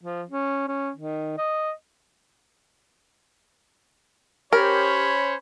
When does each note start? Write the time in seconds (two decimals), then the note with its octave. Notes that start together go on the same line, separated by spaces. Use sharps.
0.03 F3
0.30 C#4
0.68 C#4
0.96 D#3
1.38 D#5
4.53 C#4 G4 A#4 C5 C#5 B5